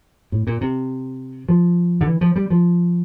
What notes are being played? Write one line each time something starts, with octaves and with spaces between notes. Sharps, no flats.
A2
A#2
C3
F3
D3
E3
F3
G3
F3